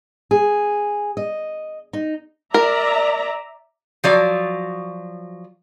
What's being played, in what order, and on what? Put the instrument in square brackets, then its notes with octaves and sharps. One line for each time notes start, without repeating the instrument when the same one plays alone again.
[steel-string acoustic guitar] G#4
D#5
D#4
[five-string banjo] A#4 [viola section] D5 E5 A#5
[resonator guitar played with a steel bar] F3 F#3 D5